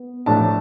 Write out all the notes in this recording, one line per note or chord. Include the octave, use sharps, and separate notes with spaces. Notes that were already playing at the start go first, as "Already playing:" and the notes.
Already playing: B3
A2 F3 A3 D4 A5